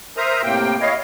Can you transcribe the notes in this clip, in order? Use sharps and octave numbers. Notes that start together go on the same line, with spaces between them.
A#4 C5 E5 A#5 D#6
A2 C3 A#3 G5
E4 C#5 D#5 F5